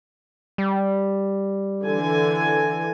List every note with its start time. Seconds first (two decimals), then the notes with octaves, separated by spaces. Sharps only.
0.58 G3
1.85 D3 E3 G#5